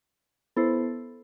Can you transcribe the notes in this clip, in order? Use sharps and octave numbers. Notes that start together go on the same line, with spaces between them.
B3 E4 A4 C5